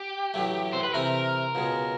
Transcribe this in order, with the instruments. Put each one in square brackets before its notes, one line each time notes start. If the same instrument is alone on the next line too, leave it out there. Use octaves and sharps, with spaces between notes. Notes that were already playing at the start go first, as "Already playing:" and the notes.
Already playing: [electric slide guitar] G4
[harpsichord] A1 A2 F#3 A3
[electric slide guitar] C5
B4
[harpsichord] C3 E3 A3 C4 [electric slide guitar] A#4
[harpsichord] C#2 B2 G#3